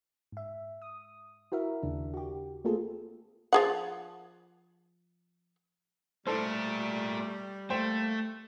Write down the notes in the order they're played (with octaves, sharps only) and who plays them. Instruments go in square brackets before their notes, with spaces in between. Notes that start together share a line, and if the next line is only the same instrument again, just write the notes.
[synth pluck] G#2 E5
D#6
E4 F#4 A#4 E5
D#2 C#3 D4
F#4 G4
A3 A#3 C4 F4 G#4 A4
[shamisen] F3 G#4 F#5
[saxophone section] G3 [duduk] A3 [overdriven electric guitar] A#3 D5 [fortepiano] A4 C5
[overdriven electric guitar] A3 [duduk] A#3 [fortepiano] C5 G5